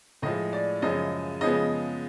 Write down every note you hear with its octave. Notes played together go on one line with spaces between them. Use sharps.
A2 F3 G#3 D#5
D5
F#2 C#3 F3 G#3 D#5
C#3 F3 G#3 B3 D#5